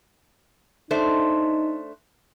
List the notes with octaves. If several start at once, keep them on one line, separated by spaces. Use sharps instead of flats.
A3 D4 D#4 C5